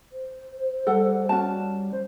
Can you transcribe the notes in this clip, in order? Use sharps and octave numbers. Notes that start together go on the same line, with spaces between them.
C5
G3 A4 F#5
C#4 F#4 A5
C5